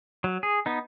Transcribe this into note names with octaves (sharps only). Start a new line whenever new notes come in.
F#3
G#4
B3 D#4